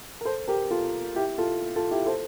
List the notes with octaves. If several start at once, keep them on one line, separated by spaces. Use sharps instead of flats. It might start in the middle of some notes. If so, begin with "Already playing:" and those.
A#4
A4 C5
G4 A#4
F4 A4
E4 G4
F4 A4
F4 A4
E4 G4
A4 C5